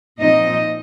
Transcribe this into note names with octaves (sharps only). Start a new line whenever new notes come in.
A#2 F3 C4 D#4 D#5